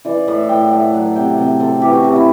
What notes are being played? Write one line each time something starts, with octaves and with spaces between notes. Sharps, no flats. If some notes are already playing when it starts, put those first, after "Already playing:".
E3 D5
A2 E5
A2 G5
F#5
A3
E5
F#3 F#5
C3 G5
C3 G5
C4 A4
E3 G4
F#4
C3 G4
E4